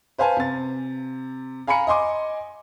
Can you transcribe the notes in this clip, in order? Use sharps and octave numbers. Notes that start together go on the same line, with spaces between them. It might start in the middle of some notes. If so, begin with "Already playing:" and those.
B4 C5 F5 G#5 A5
C3 A6
F5 G#5 A#5 B5 C#7
D#5 G#5 C6 D6